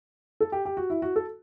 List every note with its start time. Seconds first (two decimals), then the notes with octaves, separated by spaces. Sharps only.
0.40 A4
0.52 G4
0.65 G4
0.77 F#4
0.90 E4
1.02 F#4
1.16 A4